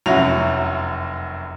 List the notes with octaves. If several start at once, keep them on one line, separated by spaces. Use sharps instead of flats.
F1 F#2 F#3 E4 F#4 F7